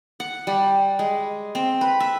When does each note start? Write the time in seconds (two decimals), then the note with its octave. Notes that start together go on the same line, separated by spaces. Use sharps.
0.20 F#5
0.47 G3
0.99 G#3
1.55 C4
1.81 B4
2.00 E5